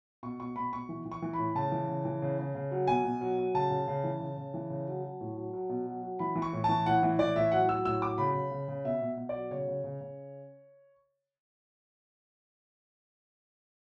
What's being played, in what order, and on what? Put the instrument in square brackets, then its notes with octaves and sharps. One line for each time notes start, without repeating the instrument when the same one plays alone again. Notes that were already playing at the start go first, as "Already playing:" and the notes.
[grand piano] B2 C#6
B2 C#6
B2 B5
B2 C#6
E3
E3
C#6
E3
A2 B5
C#3 A5
E3
C#3
E3
C#3
C#3
C#3
F#3
B2 G#5
B2
F#3
F#3
C#3 A5
C#3
C#3
E3
C#3
C#3
E3
C#3
F#3
F#3
A2
F#3
F#3
B2
F#3
F#3
E3 B5
E3
C#6
A2
E3 A5
A2 F#5
E3
E3 D5
A2 E5
F#3 F#5
F#3 E6
A2 E6
F#3 D6
C#3 B5
C#3
C#3
C#3
B2 E5
B2
B2
D5
F#3
C#3 C#5
C#3
C#3
C#3